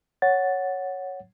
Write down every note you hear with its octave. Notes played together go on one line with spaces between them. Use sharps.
C#5 F#5 A6